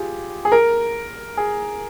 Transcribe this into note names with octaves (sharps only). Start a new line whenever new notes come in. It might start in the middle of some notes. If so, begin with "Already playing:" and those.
Already playing: F4 G4 G#4
G#4
A#4
G#4